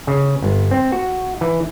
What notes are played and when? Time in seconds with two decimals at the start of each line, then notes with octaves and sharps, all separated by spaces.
0.07 C#3
0.42 G1
0.71 C4
0.92 F#4
1.41 E3